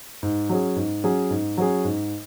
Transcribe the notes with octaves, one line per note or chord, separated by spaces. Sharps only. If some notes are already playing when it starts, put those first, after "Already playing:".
G#2
F#3 C#4 G#4
G#2
F#3 C#4 G#4
G#2
F#3 C#4 G#4
G#2